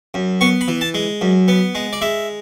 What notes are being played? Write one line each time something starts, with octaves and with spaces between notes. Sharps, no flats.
F#2
B3 C#6
B5
E3
A5
G#3
F#2
B3
G#3
D5
G#3 E5